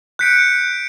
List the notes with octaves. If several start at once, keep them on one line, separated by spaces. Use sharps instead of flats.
F#6 G6 B6 C#7 D7